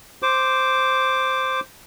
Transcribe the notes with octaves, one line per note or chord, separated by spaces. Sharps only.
C5 D6